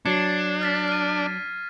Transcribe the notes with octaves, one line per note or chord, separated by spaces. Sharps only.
F#3 D4 G#6 C7 C#7
F6 A6 B6
F6 D#7